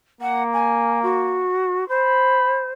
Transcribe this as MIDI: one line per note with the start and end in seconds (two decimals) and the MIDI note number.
0.21 1.47 58
0.21 0.43 78
0.53 0.99 80
1.02 1.87 66
1.88 2.71 72
1.88 2.71 83